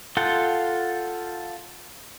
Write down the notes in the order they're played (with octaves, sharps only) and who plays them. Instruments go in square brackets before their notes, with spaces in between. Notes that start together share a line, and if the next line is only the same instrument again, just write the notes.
[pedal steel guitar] F4 A4 F#5 G5